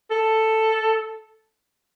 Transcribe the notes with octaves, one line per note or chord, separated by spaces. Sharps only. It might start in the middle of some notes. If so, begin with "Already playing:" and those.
A4